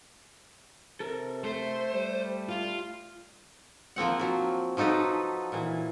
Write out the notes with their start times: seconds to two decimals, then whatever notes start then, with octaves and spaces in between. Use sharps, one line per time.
1.00 C3 A4 A#4
1.44 A3 C5
1.93 G3
2.49 F4
3.96 F3 A#3 C4 F#5
4.19 F3 F#3
4.77 F3 F#3 D#4 A4 B4
5.52 A#2 E3